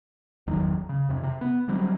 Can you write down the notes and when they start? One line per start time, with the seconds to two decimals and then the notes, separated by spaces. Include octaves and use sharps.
0.47 G1 E2 D#3 F#3
0.89 C#3
1.09 F2 C3
1.23 C3
1.41 B3
1.68 D3 F#3 G3 C4